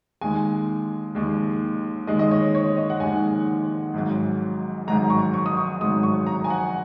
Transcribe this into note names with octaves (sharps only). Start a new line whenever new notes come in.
D#2 D#3 G#3 G#5
D#2 D#3 G#3
D#2 D#3 G#3 D#5
D#5
C#5
C#5
D#5
F#5
D#2 D#3 G#3 G#5
G#1 G#2 F#3
G#1 G#2 F#3 A#5
C#6
C#6
D#6
C#6
G#1 G#2 F#3 D#6
C#6
A#5
G#5
F#5